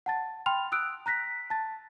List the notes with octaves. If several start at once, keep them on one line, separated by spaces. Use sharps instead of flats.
F#5 A5 A6
G5 B5 C6 F6 F7
D#6 E6 F#6 D7
A#5 F#6 A#6 B6
A5 A6